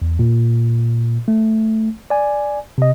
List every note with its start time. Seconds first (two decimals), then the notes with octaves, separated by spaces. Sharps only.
0.02 E2
0.19 A#2
1.28 A3
2.10 D5 G#5
2.78 C3 D#5